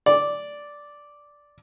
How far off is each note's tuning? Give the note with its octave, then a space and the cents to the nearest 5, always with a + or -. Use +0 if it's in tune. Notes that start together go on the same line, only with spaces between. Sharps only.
D5 -5